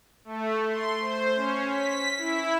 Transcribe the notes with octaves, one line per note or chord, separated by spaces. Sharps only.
A3
C6
C5
C#4
B6
E4